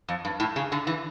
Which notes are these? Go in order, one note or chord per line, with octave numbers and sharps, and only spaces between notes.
F2
G2
A2
C#3
D3
E3